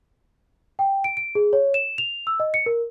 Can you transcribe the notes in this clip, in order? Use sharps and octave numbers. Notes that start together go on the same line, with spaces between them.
G5
D7
D7
G#4
C#5
E7
F7
E6
D#5
C#7
A#4